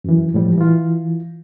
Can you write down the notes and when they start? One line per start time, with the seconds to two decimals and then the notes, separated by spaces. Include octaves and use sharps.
0.04 F#2 E3
0.34 A2 F3 G3
0.58 E3 F4